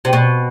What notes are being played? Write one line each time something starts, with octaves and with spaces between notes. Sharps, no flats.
C3
B2